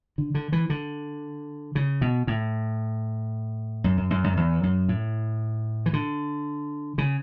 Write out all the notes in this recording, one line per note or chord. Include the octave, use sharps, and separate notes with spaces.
D3
D3
E3
D3
C#3
B2
A2
F#2
F#2
F#2
F#2
E2
F#2
A2
E3
D3
C#3